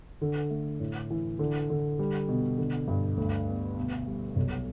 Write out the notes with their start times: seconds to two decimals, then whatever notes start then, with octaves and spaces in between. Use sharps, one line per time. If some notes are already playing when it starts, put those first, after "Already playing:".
0.21 D3
0.50 A3
0.80 A2
1.11 E3
1.39 D3
1.70 D3
1.99 G3
2.29 B2
2.58 D3
2.88 G2
3.18 D2
3.48 B3
3.77 B2
4.07 G3
4.36 B1